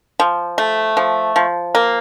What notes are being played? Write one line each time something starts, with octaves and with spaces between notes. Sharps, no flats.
F3
A3
F3
F3
A#3